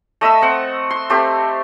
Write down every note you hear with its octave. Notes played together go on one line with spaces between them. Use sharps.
A3 D#5 B5 E6
C4 F#5
C6
A3 C4 G4